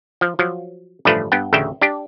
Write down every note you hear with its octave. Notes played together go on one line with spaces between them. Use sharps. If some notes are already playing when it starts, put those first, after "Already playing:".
F3
F3 F#3
A1 G2 D3 F3 A3 B4
G2 B3 G5
A1 D2 C#3 E5 G5
D4 G4